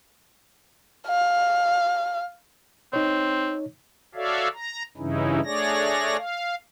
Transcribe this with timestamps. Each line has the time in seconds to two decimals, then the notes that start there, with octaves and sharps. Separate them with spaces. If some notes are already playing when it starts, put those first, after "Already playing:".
1.07 F5
2.93 C4 D#4 C#5
4.15 F#4 A4 C#5 D5 E5 F5
4.53 A#5
4.97 G2 C#3 E3 C#4 D#4 E4
5.44 A3 D4 G#4 C#5 D5 A#6
6.17 F5